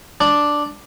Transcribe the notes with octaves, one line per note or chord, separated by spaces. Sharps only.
D4